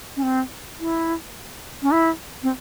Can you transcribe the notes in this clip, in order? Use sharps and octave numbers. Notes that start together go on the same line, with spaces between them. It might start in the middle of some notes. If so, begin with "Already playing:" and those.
C#4
C4
E4
C#4
E4
C4